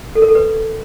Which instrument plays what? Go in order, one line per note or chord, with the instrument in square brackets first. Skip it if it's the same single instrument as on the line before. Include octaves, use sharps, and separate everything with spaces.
[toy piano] A4
A#4
A4
B4